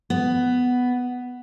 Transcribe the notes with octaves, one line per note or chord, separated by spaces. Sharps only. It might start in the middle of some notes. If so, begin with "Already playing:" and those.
B3